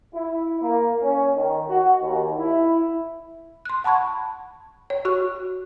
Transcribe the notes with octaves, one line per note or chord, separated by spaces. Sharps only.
E4
A#3
C#4
D#3
F#4
D#2
E4
C6 F#6
F#5 A5 B5 C#6 G#6
C#5
F#4 C#6 F#6